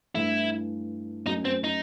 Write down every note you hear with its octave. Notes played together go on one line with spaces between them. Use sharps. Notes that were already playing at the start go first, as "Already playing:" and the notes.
G2 E3 A3 E4
F#2 F#3 A3 D#4
C4
D#4